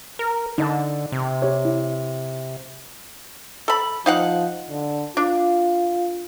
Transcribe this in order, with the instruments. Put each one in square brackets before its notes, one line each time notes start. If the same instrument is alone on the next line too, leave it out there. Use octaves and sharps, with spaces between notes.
[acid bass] A#4
[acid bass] D3 [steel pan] D#4 D#5 A5
[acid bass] C3
[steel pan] G4 C#5
E4
[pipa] A4 B5
[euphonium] F3 [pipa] D#4 F5 F#5
[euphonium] D3
[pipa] D4 [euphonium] F4